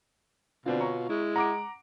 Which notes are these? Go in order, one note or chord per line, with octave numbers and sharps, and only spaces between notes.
B2 D3 C4 F4 D5
C#5 A#5 C#6
G#3 E4
F#5 A#5 D6 D7